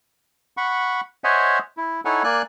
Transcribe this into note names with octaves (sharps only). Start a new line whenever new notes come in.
F#5 B5 C#6
C5 C#5 D#5 E5 F#5 G#5
E4
D#4 E4 A4 C#5 F#5 G#5
A#3 D5 G#5 F#6